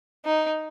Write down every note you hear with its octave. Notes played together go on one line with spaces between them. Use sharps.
D#4